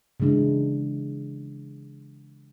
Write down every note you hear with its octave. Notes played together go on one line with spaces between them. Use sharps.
C#3 E3 G#3 D4 E4